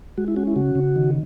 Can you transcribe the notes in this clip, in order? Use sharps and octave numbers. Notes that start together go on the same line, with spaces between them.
G#3 F#4
E4
C#4 F#4
E4
C#3 F#4
C#3
D#3